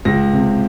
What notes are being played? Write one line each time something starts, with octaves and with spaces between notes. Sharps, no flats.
C#2 A#6
C3